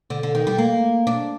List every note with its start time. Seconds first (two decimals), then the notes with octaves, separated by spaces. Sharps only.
0.10 D3
0.23 D3
0.35 D#3
0.47 G3
0.58 A#3
1.07 D4